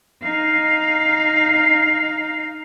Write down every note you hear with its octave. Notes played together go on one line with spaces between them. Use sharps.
D#4 F5